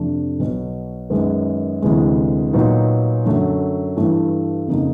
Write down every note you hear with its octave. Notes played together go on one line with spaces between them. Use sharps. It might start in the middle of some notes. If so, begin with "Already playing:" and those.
Already playing: F2 C3 F3 A3 D4
B1 B2 F#3
F#2 D#3 G#3 B3
D2 C3 E3 G#3
A#2 F#3 B3 D#4
F#2 D3 F#3 A3
G2 E3 A3
F2 C#3 F3 A#3 D#4